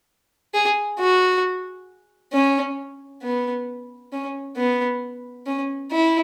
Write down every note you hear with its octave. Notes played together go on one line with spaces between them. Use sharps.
G#4
F#4
C#4
B3
C#4
B3
C#4
E4